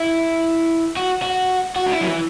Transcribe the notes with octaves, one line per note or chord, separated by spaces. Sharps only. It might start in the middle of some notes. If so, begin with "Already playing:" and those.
Already playing: E4
F#4
F#4
F#4
D4
E4
F#3
E3